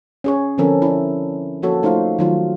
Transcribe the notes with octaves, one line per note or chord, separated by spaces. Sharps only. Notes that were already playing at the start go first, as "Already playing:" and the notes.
C#4 G#4 C#5
D3 F3 C4 C#4 A4 A#4
D4 E4
F3 A#3 F#4 A4 C#5
A3 D#4 F4 C5 F5
D#3 F#3 F4